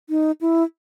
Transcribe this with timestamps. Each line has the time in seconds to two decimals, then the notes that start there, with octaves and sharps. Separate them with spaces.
0.10 D#4
0.41 E4